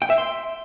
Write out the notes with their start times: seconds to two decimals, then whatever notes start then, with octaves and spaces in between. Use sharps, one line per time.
0.02 G5
0.10 E5
0.18 C6